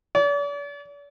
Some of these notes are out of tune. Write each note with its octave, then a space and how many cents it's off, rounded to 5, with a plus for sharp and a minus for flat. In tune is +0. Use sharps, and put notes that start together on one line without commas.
D5 -45